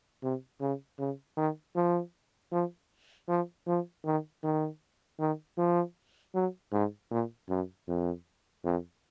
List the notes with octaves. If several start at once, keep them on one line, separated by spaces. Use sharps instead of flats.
C3
C#3
C#3
D#3
F3
F3
F3
F3
D#3
D#3
D#3
F3
F#3
G#2
A#2
F#2
F2
F2